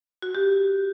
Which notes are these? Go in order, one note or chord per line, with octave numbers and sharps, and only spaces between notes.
F#4
G4